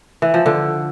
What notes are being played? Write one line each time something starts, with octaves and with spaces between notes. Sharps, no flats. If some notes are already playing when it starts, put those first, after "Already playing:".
E3
F3
D3